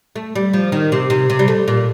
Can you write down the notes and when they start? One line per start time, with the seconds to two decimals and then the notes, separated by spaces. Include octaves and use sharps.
0.16 A3
0.35 G3
0.53 F3
0.72 D#3
0.92 C3
1.10 C3
1.30 C3
1.39 G3
1.48 A3
1.68 A#2